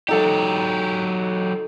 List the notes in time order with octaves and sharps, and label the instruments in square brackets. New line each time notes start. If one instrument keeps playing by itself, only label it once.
[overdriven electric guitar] F#3 G4 [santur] D#4 A4 A5